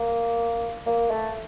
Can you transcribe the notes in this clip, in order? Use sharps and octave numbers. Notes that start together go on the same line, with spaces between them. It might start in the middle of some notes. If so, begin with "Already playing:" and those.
Already playing: A#3
A#3
A3